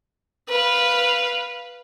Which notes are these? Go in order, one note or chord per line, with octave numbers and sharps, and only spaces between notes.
B4 F5